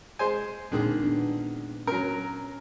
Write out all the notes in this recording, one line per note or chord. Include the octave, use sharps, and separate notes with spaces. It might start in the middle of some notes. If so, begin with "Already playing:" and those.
G#3 C5 G#5
A#2 D3 D#3 G#3 C4 G#4
B3 D4
F#3 C#4 A#4